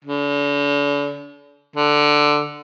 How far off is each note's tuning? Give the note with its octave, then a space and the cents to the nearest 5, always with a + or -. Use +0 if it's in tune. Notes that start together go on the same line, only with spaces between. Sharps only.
D3 -40
D3 +5